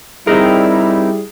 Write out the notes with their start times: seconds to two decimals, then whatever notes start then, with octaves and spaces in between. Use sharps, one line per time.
0.27 G3 C4 D#4 E4 G#4 A#4